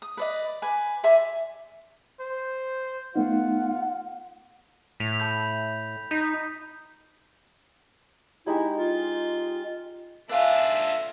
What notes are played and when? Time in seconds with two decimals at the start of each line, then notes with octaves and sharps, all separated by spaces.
0.02 D#6
0.17 B4 D5 D#5
0.62 B4 G#5 D6
1.03 D5 E5 G#5 C6
2.20 C5
3.16 A3 B3 D#4 F4 F#5
5.00 A2 B6 F7
5.20 A5 B5 G6
6.11 D#4 G6 B6
8.46 G#3 D#4 E4 G4
8.78 F4
10.29 D4 F4 A4 B4 E5 F5 G#5